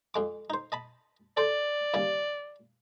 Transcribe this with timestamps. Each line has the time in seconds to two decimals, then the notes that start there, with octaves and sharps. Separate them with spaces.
0.14 F2 G#3 D6
0.50 D#4 C5
0.72 D#5 A5 B5
1.37 A4 C5 D5
1.94 D#2 C#3 G3